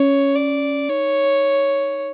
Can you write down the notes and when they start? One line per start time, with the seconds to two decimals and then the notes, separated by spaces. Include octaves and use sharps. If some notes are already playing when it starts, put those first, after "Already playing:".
Already playing: C#4 C#5
0.35 D5
0.89 D#4 C#5